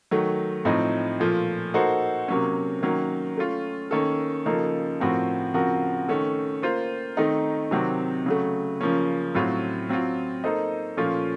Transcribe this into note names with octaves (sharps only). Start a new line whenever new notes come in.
D#3 F#3 A3
A2 F3 C4 D#4
A#2 F3 A3
A#3 D#4 F#4 A4 C5
C3 F#3 A#3 C#4
D#3 F#3 A#3 C#4
A3 C#4 F4
D#3 A#3 C#4 A4
C#3 F3 A#3 D#4 A4
A2 F3 C4 F#4 A#4
C#3 F3 C4 F#4 A#4
D#3 A3 C#4 A4
A#3 F4 C5
D#3 A3 C4 D#4 A#4
C3 D#3 F#3 C4
C#3 F#3 A3
C#3 F3 A#3 C#4
A2 F#3 C4 F4
F#3 C4 F4
A#3 D#4 A4 C5 D#5
A#2 F3 A3 C#4 F4